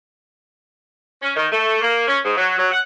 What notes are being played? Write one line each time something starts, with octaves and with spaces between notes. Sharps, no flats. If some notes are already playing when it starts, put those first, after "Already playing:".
C#4
D#3
A3
A#3
C#4
G#2
F#3
F#3
F#5